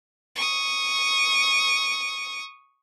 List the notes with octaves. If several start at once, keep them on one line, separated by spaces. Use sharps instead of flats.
C#6 D#6